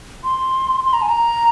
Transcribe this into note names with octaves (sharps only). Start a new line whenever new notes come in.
C6
C6
A#5
G#5
A#5